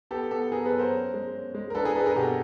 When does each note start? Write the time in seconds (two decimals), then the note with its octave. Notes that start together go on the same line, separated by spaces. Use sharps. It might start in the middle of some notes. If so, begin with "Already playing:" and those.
0.11 B3 G4 A4
0.31 B3 G4 A4
0.52 B3 G#4 A#4
0.65 A4 B4
0.72 F#3
0.79 A#4 C5
0.92 C#4
1.14 G#3
1.34 C#4
1.55 G#3
1.70 A#4
1.75 D4 A4 B4
1.85 G#4 A#4
1.95 D4 A4 B4
2.06 G#4 A#4
2.16 B2 G4 A4